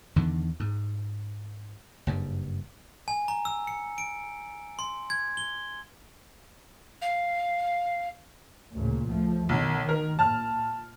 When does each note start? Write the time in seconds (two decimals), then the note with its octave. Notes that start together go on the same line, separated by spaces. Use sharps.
0.16 E2 D3 D#3
0.60 G#2
2.07 F#1 G2
3.08 G#5
3.28 A#5
3.45 E6
3.67 C#7
3.98 D7
4.79 C6
5.10 G#6
5.37 G7
7.02 F5
8.73 D2 A#2 C#3
9.06 C#2 F3 A3
9.49 B1 D#3
9.89 A#4
10.19 A#2 A5 F6